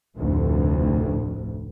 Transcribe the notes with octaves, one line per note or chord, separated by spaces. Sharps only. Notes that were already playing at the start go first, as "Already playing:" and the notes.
F1 D2 A2